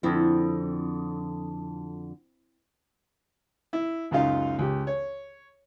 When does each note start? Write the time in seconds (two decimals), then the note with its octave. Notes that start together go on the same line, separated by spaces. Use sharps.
0.03 F2 D3 C4 E4
3.73 E4
4.11 C#2 F#2 D#4 F4 F5
4.59 C#2 G4
4.87 C#5